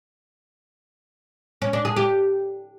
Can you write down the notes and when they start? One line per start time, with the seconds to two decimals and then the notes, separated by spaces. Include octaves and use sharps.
1.62 C#4
1.73 D4
1.85 G#4
1.96 G4